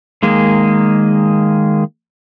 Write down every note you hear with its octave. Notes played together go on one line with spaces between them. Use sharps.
D#3 G#3 A#3 G#4